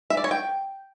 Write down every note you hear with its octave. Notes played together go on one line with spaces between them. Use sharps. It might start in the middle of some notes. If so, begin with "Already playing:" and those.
E5
D5
C#5
G5